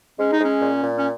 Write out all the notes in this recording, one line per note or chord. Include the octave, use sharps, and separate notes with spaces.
G#3 C#4
D#4
G#3 C#4
A#2
A#2
C#4